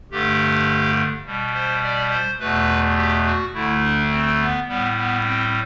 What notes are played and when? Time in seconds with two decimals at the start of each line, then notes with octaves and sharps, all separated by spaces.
0.11 G2 D3 A3 G4
1.25 B2 G3
1.54 C5
1.83 D5
2.11 C5
2.39 E2 B2 A3 B4
2.97 G4
3.25 F#4
3.54 D2 D3 A3 E4
3.82 D4
4.11 C4
4.40 B3
4.68 A2 G3 B3
4.97 B3
5.25 C4